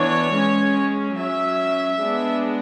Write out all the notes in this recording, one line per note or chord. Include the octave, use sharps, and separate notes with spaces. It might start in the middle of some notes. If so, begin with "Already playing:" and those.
Already playing: E3 B3 D4 C#5
G#3 C#4
F#3 C#4 E5
G#3 B3 D4